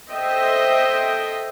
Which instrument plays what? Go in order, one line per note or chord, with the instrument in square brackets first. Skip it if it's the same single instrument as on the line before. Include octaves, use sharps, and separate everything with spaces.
[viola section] A4 C5 D#5 E5 G5